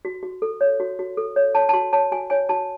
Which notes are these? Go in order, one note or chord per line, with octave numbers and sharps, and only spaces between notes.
F#4
F#4
A4
C#5
F#4
F#4
A4
C#5
C#5 A5
A5
F#4 C6
C#5 A5
F#4 G#5
C#5 G#5
F#4 A5